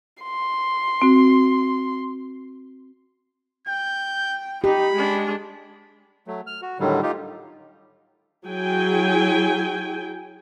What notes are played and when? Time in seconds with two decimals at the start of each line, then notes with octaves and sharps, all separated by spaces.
0.23 C6
1.02 C4 F#4
3.67 G5 G6
4.64 D#4 G4 B5
4.93 G#3 D4
6.27 F#3 A3
6.47 F6
6.62 F#4
6.80 A2 D3 D#3 F#3 G3
7.03 D#4 F4 G4
8.45 F#3 E4 G#4 G5 G#5